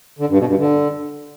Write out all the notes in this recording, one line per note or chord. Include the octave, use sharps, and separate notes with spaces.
D3
G2
B2
G2
D3